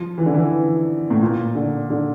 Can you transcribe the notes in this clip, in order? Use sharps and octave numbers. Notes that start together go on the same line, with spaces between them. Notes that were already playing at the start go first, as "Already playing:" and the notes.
Already playing: F3
E3
D3
E3
A2
A#2
D3
D3